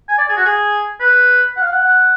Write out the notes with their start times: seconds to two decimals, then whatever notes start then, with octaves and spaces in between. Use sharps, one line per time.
0.09 G#5
0.18 D5
0.29 G#4
0.37 F#4
0.45 G#4
1.00 B4
1.57 F#5
1.61 F5
1.72 F#5
1.82 F#5